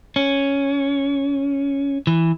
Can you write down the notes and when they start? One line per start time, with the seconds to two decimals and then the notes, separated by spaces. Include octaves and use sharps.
0.16 C#4
2.07 E3